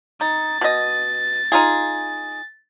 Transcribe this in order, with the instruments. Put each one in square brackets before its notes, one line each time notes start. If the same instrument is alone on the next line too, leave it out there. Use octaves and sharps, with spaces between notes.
[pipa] D#4 [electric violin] A6
[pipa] B2 D#5
D#4 F4 G#4